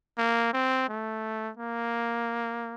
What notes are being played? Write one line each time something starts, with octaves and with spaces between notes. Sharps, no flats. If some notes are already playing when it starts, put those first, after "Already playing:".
A#3
C4
A3
A#3